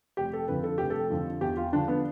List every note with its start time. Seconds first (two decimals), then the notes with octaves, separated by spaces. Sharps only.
0.17 F1 G4
0.33 A4
0.48 F2 D3 F3 B4
0.63 A4
0.78 F1 G4
0.90 A4
1.10 F2 D3 F3
1.41 E2 G4
1.57 F4
1.72 D3 F3 D4
1.88 B3